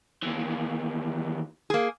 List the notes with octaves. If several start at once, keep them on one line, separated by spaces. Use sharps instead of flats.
D#2 E3
A#3 G#4